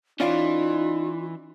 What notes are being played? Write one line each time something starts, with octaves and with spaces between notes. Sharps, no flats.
E3 C#4 D#4 F4 D5 F5